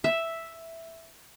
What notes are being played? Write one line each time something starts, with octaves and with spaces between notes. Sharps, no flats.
E5